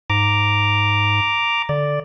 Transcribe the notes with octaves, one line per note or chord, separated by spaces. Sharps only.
G#2 A#5 D6
D3 D5